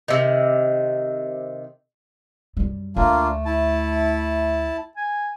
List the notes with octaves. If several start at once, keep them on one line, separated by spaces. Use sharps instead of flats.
C3 D#3
F#2 G3
D2 A3 A#3 D4 F4
E4 A5
G#5